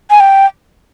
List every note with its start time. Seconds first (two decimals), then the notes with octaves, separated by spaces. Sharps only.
0.10 G#5
0.20 G5